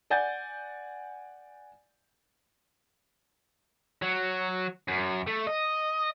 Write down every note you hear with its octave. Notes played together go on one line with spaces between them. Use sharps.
D5 F#5 G#5 G6 A6
F#3
F#2
A3
D#5